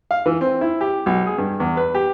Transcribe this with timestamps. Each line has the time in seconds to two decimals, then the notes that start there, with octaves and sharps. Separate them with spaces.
0.11 F5
0.26 E3
0.41 C4
0.61 E4
0.81 G4
1.06 B1
1.26 G#4
1.38 G2
1.60 E2
1.77 B4
1.95 G4